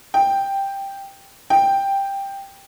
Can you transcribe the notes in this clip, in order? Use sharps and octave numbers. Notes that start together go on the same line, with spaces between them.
G5
G5